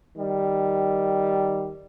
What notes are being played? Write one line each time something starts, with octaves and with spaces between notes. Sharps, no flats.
D#3 G3